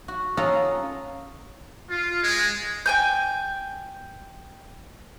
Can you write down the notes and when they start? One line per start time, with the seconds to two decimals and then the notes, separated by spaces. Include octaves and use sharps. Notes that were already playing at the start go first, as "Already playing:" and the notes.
0.08 F#4
0.37 C#4 F4 A4 D#5 F#5 A#5
1.90 F4
2.23 G#3
2.86 G5 G#5 G6